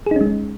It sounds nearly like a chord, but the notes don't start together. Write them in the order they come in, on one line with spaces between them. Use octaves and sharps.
G#4 D#4 C#4 G#3